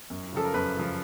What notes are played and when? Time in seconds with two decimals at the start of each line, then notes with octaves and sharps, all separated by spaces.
0.10 F#2
0.33 C#3 F3 A4
0.45 A#4
0.54 F#2 B4
0.77 C#3 F3